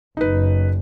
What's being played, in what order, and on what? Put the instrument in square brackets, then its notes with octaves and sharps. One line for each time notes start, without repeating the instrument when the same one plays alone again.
[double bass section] F#1 [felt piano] D#4 B4